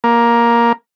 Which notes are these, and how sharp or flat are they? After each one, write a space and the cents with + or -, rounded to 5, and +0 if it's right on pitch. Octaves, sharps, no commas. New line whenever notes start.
A#3 +10